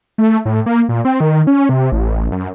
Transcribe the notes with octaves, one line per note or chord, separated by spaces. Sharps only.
A3
A2
A#3
A#2
C4
D#3
C#4
C3
A1
F#2